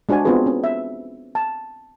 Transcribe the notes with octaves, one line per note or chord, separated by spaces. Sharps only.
G#3 D4 F#4 C5 G#5
B3 C4 F4 F#4 G#4 B4
C#4
E5
A5